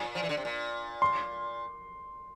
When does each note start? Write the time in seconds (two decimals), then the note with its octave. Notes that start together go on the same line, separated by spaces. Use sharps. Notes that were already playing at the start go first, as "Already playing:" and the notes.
Already playing: A#2
0.15 F3
0.23 E3
0.29 D3
0.37 C3
0.45 A#2
1.02 C6